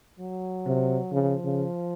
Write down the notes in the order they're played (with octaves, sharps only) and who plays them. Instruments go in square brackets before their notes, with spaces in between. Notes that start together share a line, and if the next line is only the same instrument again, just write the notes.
[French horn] F#3
[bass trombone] C3
[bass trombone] C#3 [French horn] F3
[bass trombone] C#3